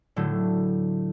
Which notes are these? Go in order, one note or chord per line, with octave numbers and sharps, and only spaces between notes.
A2 D3 F#3 A3